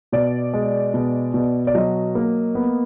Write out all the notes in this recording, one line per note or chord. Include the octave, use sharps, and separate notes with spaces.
B2 D5
G#3
B2
B2
D5
F#3 D#5
A#3
B3